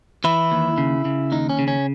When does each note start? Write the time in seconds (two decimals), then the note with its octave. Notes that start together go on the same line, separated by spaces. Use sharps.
0.24 E3 E4
0.52 D#2
0.78 C#3
1.05 C#3
1.32 D#2 D#4
1.49 C#4
1.59 C#3
1.68 C#4